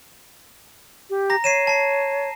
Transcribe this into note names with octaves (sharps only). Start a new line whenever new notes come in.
G4
A#5 A#6
C#5 C7 D#7 E7
A5 C7